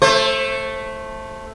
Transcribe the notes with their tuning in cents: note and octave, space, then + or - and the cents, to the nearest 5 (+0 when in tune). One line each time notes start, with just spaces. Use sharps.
A3 +0 C5 +30